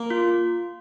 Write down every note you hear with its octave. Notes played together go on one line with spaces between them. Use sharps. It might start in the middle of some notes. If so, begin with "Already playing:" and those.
Already playing: A#3
F4